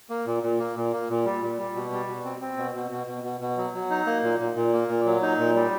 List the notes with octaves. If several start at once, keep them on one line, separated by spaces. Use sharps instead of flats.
A#3
A#2
A#2
A#3
A#2
A#3
A#2
G3
A#2
G3
B2
G3
B2
C4
C4
B2
B2
B2
B2
B2
B2
F#3
F#3
D#4
A#3
A#2
A#2
A#2
A#3
A#2
F#3
D#4
A#2
G3